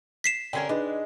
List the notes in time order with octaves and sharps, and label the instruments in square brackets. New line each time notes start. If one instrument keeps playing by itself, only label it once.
[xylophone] B6 C7 E7
[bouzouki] D3 C#4 A#4 [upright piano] G5 G#5 G#6
[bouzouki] G#3 [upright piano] D4 D#4 B4